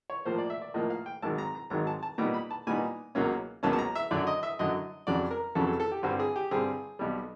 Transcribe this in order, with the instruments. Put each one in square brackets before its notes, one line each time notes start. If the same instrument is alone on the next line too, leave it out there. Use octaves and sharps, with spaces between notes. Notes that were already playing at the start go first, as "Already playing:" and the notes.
[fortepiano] C#5
A2 F3 A#3 C5
D5
E5
D5
A2 F3 A#3 D#5
F5
G5
G#1 G#2 D#3 F#3 A5
A#5
A#5
G#1 G#2 D#3 F#3 A#5
A5
A5
A#2 G3 B3 D#4 A#5
B5
A5
A#2 G3 B3 D#4 G#5
C#2 B2 F#3 A#3 C#4
C#2 B2 F#3 A#3 C#4 A5
A5
A#5
E5
F#2 D3 F#3 D5
D#5
E5
F#2 D3 F#3 D#5
F2 C#3 F#3 D5
A#4
F2 C#3 F#3 A4
A4
A4
G4
G2 D3 G3 C4 F#4
G#4
G4
G2 D3 G3 C4 G#4
B1 B2 G3